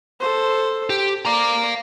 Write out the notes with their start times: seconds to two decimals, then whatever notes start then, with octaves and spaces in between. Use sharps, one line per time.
0.20 A4 C5
0.90 G4
1.25 D5 F5 A#5